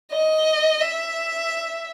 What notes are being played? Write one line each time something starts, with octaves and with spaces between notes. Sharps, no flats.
D#5
E5